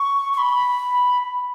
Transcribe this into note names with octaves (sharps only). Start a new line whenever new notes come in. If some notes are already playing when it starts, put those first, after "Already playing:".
Already playing: C#6
C#6
B5